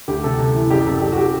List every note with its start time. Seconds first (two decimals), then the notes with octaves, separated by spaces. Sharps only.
0.08 D2 G4
0.24 C3 A4
0.39 C3
0.55 E3
0.71 F#1 G4
0.86 F#1 A4
1.02 F#1 G4
1.12 F#4
1.17 G4